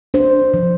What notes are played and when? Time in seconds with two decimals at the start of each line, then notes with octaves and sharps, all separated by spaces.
0.14 D4 C5
0.54 F3